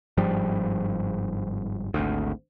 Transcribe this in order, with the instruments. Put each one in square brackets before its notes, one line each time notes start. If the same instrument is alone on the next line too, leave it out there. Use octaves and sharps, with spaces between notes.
[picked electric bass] G1 G#2 F3 G3
G#1 D2